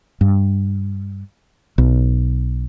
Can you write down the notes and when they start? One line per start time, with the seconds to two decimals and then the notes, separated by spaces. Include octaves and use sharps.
0.21 G2
1.78 B1